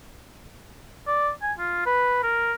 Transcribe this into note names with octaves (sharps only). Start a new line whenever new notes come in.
D5
G#5
F4
B4
A#4